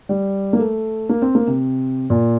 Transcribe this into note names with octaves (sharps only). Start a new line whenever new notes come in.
G3
A#3
A3
A#3
C4
A#3
C3
A#2